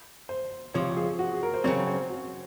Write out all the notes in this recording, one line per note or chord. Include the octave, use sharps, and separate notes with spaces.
C5
C#2 C3 F3 C#5
G#4
F#4
G#4
A#4
C5
C#3 F#3 C4 C#5
C5
F#4